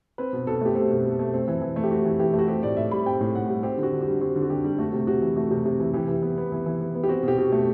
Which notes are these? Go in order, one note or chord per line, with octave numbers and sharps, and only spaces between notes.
C4 B4
B2
B2 A4
A3 G4
C4 A4
B2
B2
A3
C4
E3
E3
A3
G4
C4 F#4
E3
E3 G4
A3 F#4
C4 G4
A2 D5
A2 E5
G3 B5
C4 G5
A2
A2 F#5
G3
C4 G4
D3
F#4
D3
F#4
G3
C4 F#4
D3
F#4
D3 G4
G3
A3 F#4
C3
C3 F#4
E3
A3 F#4
C3
C3
E3
E3 G4
E3
B3
B3
E3
E3
B3
B3
G4
C4 F#4
B2 G4
B2 F#4
A3